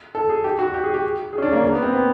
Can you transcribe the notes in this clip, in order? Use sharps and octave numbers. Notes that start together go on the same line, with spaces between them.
A4
G#4
G4
F#4
G4
G#4
G4
G#4
C#4
D4
A#3
A#3
B3
C4
B3